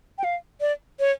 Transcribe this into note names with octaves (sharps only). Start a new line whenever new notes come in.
G5
F5
D5
C#5